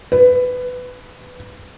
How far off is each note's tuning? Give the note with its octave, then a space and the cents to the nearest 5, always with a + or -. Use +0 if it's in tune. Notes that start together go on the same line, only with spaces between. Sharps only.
B4 +15